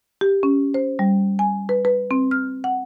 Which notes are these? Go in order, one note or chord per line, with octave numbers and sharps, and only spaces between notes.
G4
C#4
C5
G3
G#5
B4
B4
C4
F6
F#5